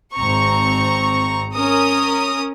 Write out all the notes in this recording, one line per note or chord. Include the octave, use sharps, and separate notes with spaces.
G#1 C4 A#5 C#6
C#4 A#4 D#6